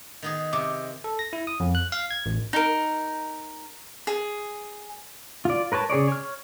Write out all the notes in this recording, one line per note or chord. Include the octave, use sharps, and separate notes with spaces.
D#3 B3 G#4
C3 D6
A4
A#6
E4
D#6
F2
F#6
F5
G#6
A1
D#4 A#4
G#4
F4 D5
A#4 B4 C#5 A5
C#3 G#4 C#5 D5
C#5 F6